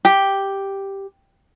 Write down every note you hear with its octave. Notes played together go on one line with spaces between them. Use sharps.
G4